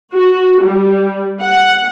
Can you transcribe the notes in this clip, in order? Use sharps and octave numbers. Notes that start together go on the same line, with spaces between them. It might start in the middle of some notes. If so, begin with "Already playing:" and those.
F#4
G3
F#5